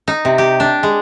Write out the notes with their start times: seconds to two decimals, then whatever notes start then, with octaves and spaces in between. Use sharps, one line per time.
0.08 D#4
0.25 C3
0.38 G4
0.60 D4
0.83 G#3